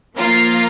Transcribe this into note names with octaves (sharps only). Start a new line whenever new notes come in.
F3 A#3 F4 A#4